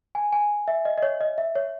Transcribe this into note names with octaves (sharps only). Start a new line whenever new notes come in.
G#5
G#5
E5
D#5
D#5
C#5
D#5
E5
C#5